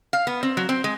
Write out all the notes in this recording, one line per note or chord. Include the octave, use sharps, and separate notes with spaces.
F5
B3
C4
F#3
C4
G#3